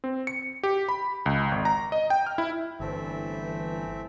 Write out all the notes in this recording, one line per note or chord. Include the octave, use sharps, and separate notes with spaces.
C4
C#7
G4
B5
C#2
G#1
A#5
D#5
G5
F6
E4
G1 E3 A3 C4 E5